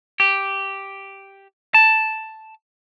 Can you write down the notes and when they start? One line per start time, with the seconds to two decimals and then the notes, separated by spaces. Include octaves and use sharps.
0.20 G4
1.74 A5